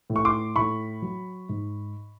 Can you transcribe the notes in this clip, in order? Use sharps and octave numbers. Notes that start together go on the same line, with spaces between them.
A2
C#6
C6 D6
A2 B5 C#6
F#3
G#2